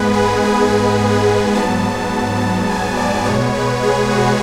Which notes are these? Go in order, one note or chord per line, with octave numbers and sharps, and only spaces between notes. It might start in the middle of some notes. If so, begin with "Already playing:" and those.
Already playing: G#2 G#3 B3 B4
G#4
G#4
B4
B4
G#2 F#3 B3 A5
A5
G#5
D5
B2 G#3 B3 C#5
B4
G#4
F#4